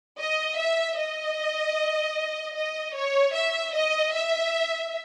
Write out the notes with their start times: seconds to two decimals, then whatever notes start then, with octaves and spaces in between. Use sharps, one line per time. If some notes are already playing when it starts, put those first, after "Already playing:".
0.19 D#5
0.58 E5
0.98 D#5
2.56 D#5
2.95 C#5
3.35 E5
3.75 D#5
4.14 E5